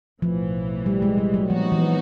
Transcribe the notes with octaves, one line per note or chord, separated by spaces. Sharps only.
B1 A2 E3 F3
G3
G#3
G3
F#3
A#2 F3 F#3 B3 D#4 F#4
E3